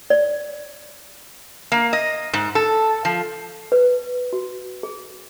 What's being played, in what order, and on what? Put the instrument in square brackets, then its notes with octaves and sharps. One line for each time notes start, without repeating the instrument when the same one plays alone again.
[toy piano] D5
[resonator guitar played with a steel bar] A#3
D#5
G#2
A4
F3
[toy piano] B4
F#4
G#4